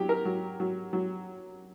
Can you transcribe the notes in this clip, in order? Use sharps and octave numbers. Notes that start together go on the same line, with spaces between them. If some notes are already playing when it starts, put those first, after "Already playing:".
Already playing: F#3 G4
A#4
F#3
F#3
F#3